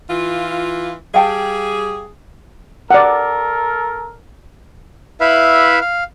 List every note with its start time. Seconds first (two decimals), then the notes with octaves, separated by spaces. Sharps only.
0.10 E3 F4
1.14 G3 G#4 F5 G5 A5
2.91 A4 A#4 D5 F#5
5.21 E4 B4 E5 F5 B5
5.81 F5